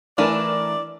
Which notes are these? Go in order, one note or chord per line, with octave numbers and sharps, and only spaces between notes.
E3 A3 D4 E4 A#4 B4 D5